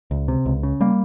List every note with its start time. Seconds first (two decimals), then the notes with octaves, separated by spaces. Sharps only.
0.11 C#2
0.28 C3
0.46 C#2
0.63 C#3
0.81 G3 A#3